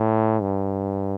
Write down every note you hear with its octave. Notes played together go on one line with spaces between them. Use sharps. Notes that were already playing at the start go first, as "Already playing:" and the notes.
Already playing: A2
G2